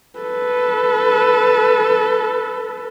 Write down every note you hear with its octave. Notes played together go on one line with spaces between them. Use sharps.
A4 B4